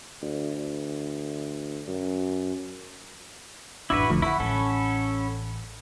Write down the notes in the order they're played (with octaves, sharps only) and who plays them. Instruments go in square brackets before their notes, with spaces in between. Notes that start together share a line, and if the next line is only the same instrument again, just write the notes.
[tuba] D2
F#2
[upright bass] A1 F#2 [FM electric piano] D4 D6 E6 [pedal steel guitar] E4 F#4 B4
[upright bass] F1 B1 [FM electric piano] D3 F3 A3
[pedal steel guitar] E4 [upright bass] F4 [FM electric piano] F#5 B5 C#6
[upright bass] A1 [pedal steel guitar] C#4 A4